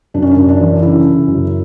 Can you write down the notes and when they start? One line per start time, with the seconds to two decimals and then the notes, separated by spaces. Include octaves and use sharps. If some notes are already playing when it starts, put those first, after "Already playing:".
0.14 F#2 D4
0.22 C#4
0.31 F#2 D4
0.48 D4
0.60 E3
0.82 C#3 E4
1.04 C#3
1.27 F#2